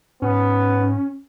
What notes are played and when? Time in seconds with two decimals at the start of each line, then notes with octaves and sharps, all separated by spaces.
0.22 G#2 B3 C#4